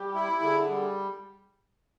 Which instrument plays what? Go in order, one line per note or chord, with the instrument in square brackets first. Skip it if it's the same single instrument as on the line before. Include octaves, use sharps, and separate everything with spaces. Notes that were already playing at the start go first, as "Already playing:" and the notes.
Already playing: [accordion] G3 [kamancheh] G4
[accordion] E4
[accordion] D3 [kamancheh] G#4
[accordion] G3